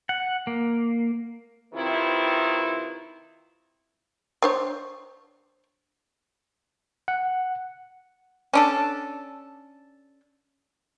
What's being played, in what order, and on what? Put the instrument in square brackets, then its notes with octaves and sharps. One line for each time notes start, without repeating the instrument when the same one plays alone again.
[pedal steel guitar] F#5
A#3
[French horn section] C3 D#3 C4 E4 F4 B4
[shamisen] D4 C5 C#5
[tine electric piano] F#5
[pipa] C#4 D4 A4